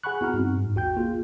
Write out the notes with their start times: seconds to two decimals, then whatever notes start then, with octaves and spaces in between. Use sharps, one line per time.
0.03 G#4 F#5 G#5 B5 C#6 F#6
0.21 B3 E4 F#4 F#5 A#5 F6
0.33 G2 C4 D#4
0.57 G#2
0.75 A1 E2 F#4 G5 G6
0.96 A#3 F4 G#4